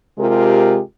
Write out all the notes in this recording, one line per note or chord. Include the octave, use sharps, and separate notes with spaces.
C3 G#3 F4 G4 A#4